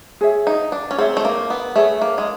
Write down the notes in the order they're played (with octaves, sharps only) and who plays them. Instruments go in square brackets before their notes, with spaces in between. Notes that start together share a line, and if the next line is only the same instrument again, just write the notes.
[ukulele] G#4 C#5 E5
[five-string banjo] D#4
D4
C#4
[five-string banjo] C4 [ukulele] G#4 C#5 E5
[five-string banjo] A3
A#3
B3
[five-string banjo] A3 [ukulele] G#4 C#5 E5
[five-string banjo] A#3
G#3